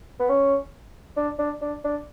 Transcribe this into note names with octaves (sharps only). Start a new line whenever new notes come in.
B3
C#4
D4
D4
D4
D4